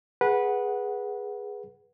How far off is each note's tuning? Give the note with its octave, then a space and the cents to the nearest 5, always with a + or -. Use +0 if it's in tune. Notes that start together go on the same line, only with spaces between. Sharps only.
G#4 +0 B4 -15 F#5 +0